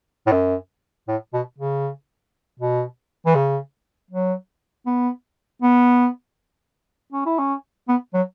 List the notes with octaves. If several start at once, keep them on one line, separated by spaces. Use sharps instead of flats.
A2
F#2
A2
B2
C#3
B2
E3
C#3
F#3
B3
B3
C#4
E4
C#4
B3
F#3